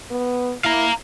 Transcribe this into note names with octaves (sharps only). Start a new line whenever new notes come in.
B3
E4 F5 A#5